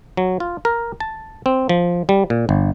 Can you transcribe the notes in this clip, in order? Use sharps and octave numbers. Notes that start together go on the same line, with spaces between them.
F#3
F4
A#4
A5
C4
F3
G3
A#2
G1